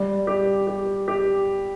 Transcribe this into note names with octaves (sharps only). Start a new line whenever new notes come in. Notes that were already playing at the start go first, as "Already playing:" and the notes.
Already playing: G3
G4
G4
G4